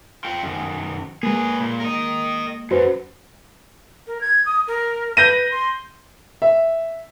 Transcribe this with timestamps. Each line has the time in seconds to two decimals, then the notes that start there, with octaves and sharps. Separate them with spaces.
0.25 F4 G5
0.43 F#2 D#3
1.23 G#3 A#3 G#4 B4
1.60 A#2
1.80 A#4 D#5
2.71 F#2 F#4 B4 C5
4.07 A#4
4.21 G#6
4.46 D#6
4.68 A#4
5.17 B4 G6 A#6 D#7
5.51 C6
6.42 E5